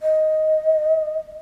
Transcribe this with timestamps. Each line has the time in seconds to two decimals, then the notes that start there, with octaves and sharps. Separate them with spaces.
0.02 D#5